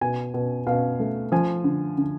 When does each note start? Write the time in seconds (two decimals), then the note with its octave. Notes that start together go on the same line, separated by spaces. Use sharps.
0.01 B2 G#5
0.34 B2
0.67 B2 F5
1.00 A3
1.32 F3 G#5
1.64 D3
1.98 D3